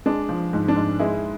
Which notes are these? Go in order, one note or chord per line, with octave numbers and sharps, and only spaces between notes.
G#3 D4
F3
G#2
D4
G#2
G#3 E4